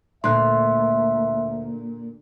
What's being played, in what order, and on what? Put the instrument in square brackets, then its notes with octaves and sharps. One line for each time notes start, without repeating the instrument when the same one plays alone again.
[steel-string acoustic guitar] D2 [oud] A#2 [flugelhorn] E5 [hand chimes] C6 F#6